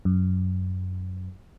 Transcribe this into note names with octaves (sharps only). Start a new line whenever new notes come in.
F#2